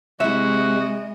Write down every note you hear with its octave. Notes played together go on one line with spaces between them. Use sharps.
C3 G#3 E4 F#4 D#5 E5